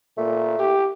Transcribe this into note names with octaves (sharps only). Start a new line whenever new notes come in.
A#2 A3
G4